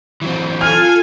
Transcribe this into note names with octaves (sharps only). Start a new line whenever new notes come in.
E3 F#3 C4
F4 A4 G#5 F6